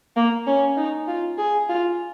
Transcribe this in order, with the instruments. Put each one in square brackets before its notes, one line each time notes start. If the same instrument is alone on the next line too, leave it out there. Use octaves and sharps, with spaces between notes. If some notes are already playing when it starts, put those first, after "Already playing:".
[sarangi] A#3
C#4
D#4
F4
G#4
F4